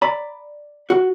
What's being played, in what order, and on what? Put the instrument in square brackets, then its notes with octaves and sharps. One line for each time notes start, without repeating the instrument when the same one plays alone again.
[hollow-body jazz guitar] D5 A#5 B5
F#4